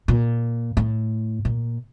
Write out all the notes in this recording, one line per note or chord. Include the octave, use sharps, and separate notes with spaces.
A#2
A2
A#2